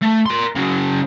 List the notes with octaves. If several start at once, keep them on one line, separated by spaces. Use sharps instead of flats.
A3
A#4 C6
C#3 F#3